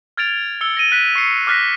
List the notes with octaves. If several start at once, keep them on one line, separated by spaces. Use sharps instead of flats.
F6 G#6 A6 D7 F7
E6 C#7 G7
A#6 D#7
F#6 B6
C#6 C7 C#7
D6 F6 F#6 A#6 B6